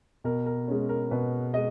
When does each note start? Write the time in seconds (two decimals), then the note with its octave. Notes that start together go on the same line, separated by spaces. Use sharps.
0.24 B2 A#4
0.46 A#4
0.68 G#3 C#4
0.89 A#4
1.11 B2 B4
1.54 G#3 D#5